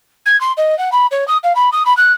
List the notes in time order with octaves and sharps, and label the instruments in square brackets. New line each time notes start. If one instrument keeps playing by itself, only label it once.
[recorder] G#6
C6
D#5
F#5
B5
C#5
D#6
F5
B5
D#6
B5
F#6